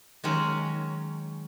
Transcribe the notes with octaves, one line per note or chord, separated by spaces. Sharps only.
D#3 F#3 G#3 C#4